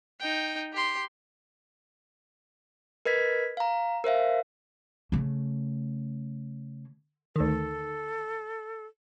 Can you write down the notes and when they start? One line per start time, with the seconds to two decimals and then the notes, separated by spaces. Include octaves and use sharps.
0.20 D#4 G5
0.73 G4 C6
3.05 A#4 B4 D#5 G#6 B6
3.57 F5 A#5
4.04 A#4 C5 E5 F5
5.12 C#3 A3
7.36 D2 D#3 A4